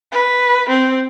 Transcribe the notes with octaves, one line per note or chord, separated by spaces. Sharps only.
B4
C4